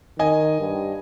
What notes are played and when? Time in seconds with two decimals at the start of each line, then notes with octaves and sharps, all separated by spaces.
0.19 D#3 D#5 G#5
0.60 G2